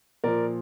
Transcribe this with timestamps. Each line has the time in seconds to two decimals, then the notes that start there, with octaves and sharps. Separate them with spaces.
0.24 A#2 F3 A#4 D5